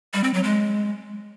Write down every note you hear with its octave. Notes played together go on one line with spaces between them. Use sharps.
G3
C4
F#3
G#3